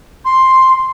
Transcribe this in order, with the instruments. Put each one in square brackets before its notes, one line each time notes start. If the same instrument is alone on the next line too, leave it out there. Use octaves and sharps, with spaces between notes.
[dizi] C6